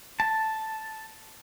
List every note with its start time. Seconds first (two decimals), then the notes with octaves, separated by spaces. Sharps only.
0.20 A5